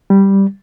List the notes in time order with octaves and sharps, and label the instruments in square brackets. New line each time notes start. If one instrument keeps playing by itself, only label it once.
[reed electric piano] G3